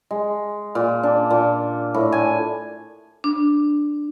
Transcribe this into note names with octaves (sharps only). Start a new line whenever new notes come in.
G#3
A#2
D4
A#2
A2
G#5
D4